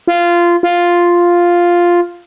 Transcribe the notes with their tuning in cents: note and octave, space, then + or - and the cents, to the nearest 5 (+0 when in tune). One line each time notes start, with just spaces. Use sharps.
F4 -15
F4 +0